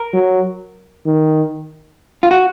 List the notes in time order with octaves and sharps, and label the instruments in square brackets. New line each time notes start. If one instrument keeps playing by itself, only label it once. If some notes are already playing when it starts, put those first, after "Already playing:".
Already playing: [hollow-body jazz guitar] A#4
[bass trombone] F#3
D#3
[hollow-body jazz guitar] F4
F#4